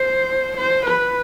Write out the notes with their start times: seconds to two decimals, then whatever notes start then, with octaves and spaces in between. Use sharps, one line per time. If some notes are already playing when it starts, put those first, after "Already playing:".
Already playing: C5
0.57 C5
0.86 B4